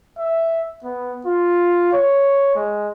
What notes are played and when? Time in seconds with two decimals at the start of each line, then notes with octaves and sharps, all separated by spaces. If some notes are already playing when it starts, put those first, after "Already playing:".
0.18 E5
0.84 B3
1.26 F4
1.93 C#5
2.55 G#3